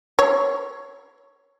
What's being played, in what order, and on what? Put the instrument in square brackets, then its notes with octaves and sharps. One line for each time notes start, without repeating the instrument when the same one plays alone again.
[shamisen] C#5